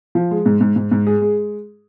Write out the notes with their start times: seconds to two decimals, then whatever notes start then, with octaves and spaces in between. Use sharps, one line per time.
0.15 F3
0.31 G#3
0.46 G#2
0.61 G#2
0.76 G#2
0.91 G#2
1.07 G#4
1.22 G#3